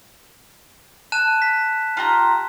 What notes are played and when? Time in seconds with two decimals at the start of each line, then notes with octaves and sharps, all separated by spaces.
1.12 A5 F#6 E7
1.42 B6
1.97 F4 G4 A#5